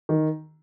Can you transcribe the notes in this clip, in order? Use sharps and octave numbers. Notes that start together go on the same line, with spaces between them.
D#3